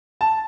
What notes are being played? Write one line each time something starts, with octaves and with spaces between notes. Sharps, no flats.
A5